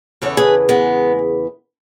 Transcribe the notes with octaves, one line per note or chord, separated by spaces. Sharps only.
E2 C#3 E3 A4 C#5
G#4 B4
G#3 B3